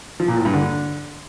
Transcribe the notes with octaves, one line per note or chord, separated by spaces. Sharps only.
F3
A#2
A2
G2
D3